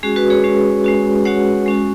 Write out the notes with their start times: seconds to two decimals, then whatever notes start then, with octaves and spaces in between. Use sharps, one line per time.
0.03 G#3 C#4 F#4 G#4
0.16 F#4 B4
0.30 G#4 C#5
0.44 G#3 C#4 F#4
0.84 G#3 C#4 F#4
1.25 G#3 C#4 F#4 C#5 F#5
1.66 G#3 C#4 F#4